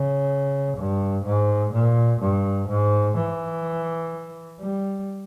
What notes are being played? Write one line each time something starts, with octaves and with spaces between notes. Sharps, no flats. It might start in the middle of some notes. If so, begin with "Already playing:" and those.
Already playing: C#3
G2
G#2
A#2
G2
G#2
E3
G3